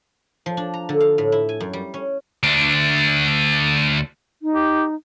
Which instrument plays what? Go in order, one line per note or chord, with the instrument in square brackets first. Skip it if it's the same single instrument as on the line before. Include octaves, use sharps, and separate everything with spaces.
[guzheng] F3
D4
A#5
D3
F5
A2
E4
G#5
F#2
G3
C#4
[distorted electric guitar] D2 D4
[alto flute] D#4
[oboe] G4